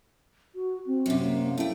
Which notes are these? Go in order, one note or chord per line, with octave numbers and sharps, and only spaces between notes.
F#4
C4
F#2 C3
A#3
A3 E4 G5